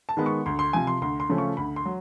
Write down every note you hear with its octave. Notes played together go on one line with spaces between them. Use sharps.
A5
D#3 G#3 B3
C#6
D2 C6
C6
C3 F3 G#5
C6
D2 C6
C6
C#3 F3 A3 C#4
C#6
D2 B5
C6
F#3